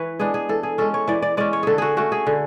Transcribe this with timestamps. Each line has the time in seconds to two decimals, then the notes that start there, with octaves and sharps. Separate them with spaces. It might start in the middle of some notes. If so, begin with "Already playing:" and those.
Already playing: E3 B4 C#5
0.20 G#3 B3 D4 G#4
0.34 G#4
0.49 E3 A4
0.63 G#4
0.78 G#3 C#4 A4
0.94 C#5
1.08 E3 D5
1.22 D5
1.37 G#3 C#4 D5
1.53 C#5
1.63 D3 G#4 A4
1.78 F#4 G#4
1.97 A3 C#4 F#4
2.12 G#4
2.27 D3